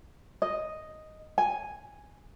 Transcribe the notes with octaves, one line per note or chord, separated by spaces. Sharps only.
D#5
G#5